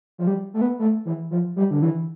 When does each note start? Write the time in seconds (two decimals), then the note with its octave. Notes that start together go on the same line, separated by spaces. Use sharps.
0.18 F3
0.27 G3
0.54 A3
0.62 B3
0.79 A3
1.05 E3
1.31 F3
1.56 G3
1.71 D3
1.82 E3